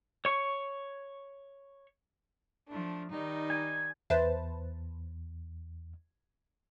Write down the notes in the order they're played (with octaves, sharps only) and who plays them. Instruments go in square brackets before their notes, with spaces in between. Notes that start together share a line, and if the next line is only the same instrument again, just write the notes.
[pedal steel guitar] C#5 C#6
[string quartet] F3 A3 D4
D#3 G3 D#4
[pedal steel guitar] G#5
[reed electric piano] E2 [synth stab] B4 C5 A5 [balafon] E5